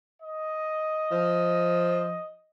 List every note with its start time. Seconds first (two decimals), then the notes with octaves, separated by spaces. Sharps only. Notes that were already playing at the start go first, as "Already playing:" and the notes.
0.21 D#5
1.12 F3